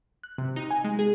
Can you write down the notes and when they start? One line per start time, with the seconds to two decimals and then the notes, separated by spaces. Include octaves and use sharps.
0.23 F#6
0.38 C3
0.56 D#4
0.71 G#5
0.84 G#3
0.99 G#4